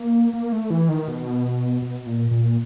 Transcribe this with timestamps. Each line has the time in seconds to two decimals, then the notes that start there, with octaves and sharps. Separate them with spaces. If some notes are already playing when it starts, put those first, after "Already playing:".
Already playing: A#3
0.33 A#3
0.52 A3
0.70 E3
0.89 D#3
1.08 B2
1.82 B2
2.06 A#2
2.31 A#2